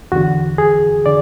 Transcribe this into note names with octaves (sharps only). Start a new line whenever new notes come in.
E2 D3 F#4
G#4
D3 D5